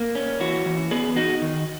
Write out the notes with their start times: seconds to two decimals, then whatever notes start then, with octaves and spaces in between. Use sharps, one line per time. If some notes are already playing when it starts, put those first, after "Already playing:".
Already playing: A#3
0.15 C#4
0.40 E3 F#4
0.66 E3
0.91 B3 G#4
1.16 D#4 F#4
1.42 D#3